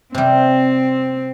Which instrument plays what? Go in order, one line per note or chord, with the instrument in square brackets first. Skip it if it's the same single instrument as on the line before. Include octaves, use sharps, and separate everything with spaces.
[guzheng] C3 G3 [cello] C4